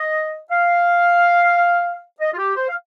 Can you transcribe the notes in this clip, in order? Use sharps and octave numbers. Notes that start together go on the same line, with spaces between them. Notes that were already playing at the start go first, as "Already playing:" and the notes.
Already playing: D#5
F5
D#5
F4
G4
C5
F5